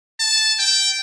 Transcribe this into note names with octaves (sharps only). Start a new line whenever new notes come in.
A5
G5